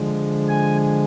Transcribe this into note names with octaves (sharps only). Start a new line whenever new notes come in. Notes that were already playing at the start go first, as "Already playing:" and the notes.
Already playing: D3 F3 G#3
G#5